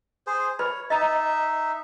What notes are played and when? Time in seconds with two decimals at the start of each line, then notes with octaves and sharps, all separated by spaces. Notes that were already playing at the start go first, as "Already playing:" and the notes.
0.27 G#4 C5
0.59 B4 C#5 B5
0.90 D#4 D#5 E5 A#5